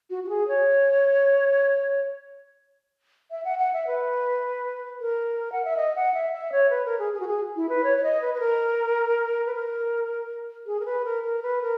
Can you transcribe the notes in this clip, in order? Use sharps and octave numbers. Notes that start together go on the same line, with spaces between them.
F#4
F#4
G#4
C#5
E5
F#5
F#5
E5
B4
A#4
F#5
E5
D#5
F#5
E5
E5
C#5
B4
A#4
G#4
G#4
F#4
G#4
E4
B4
C#5
C#5
D#5
B4
B4
A#4
B4
A#4
G#4
A#4
B4
A#4
A#4
B4
A#4